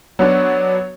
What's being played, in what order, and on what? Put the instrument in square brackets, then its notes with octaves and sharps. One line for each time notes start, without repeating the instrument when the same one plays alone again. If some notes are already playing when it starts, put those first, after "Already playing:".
[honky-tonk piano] F#3 B3 D4 [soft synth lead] C#5